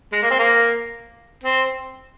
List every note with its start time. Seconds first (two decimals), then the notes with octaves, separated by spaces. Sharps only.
0.13 G#3
0.23 A#3
0.31 C4
0.39 A#3
1.44 C4